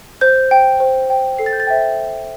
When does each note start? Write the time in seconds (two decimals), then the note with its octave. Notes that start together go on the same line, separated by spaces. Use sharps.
0.21 C5 G6
0.51 G5
0.80 C5
1.10 G5
1.38 A4 C7
1.46 A6
1.53 G6
1.60 A6
1.67 C5 E5 G5